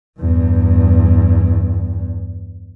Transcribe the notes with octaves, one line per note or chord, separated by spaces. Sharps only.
E2 G2